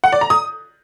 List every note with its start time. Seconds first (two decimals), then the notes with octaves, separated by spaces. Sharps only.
0.04 F#5
0.12 D5
0.21 A#5
0.30 D#6